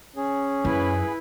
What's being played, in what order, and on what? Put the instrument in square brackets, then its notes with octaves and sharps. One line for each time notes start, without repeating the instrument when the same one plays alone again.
[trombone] C#4 [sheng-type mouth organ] G#4
[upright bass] F#2 [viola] E4 B4